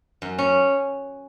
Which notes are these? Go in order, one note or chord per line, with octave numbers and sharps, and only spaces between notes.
F#2
C#4